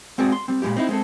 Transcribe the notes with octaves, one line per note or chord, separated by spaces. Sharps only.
G#3 C4 F#4 G#4 D5
C6
G3 C4
A#2 G3 G#3 F4 G4
C4 D#4 E4
G#3 C4 A4